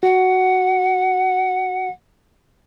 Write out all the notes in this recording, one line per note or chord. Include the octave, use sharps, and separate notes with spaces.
F#4 F#5